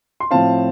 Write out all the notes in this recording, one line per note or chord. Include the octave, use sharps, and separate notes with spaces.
C6
A2 F3 C4 F5 A5